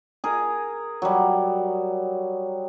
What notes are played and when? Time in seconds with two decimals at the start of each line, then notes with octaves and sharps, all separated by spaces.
0.24 G#4 A#4
1.02 F#3 G3